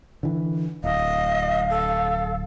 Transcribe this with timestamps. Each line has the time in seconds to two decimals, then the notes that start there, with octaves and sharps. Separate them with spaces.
0.23 D3 E3
0.84 D1 D#5 F5
1.70 A4